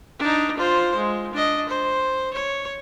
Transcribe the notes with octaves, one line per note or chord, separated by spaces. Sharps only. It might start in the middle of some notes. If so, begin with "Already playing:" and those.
D4 D#4
F4 C5
G#3
D4 D#5
C5
C#5